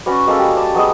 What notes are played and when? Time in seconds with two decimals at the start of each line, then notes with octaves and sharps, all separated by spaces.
0.06 C#4 F#4 B4 D5
0.27 G#3 A#3 C#4 A4
0.39 G3
0.56 D5 A5
0.75 F#3 B3 G#4 D#5